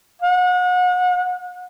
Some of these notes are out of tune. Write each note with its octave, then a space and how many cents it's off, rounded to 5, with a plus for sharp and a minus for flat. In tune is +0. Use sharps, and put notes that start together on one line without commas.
F#5 -35